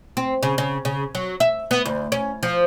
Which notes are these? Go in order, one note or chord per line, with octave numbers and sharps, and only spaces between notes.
C4
C#3
C#3
C#3
F#3
E5
B3
D2
C#4
F3